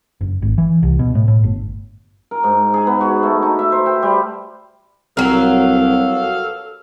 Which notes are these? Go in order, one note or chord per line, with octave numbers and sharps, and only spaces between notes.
F#1
G#1
E3
C2
B2
A2
A2
G1
A#4
G#2
G#4
B3
F#4
A3
D#4
E5
C5
G5
G3
C2 F#3 A4 A#4 F5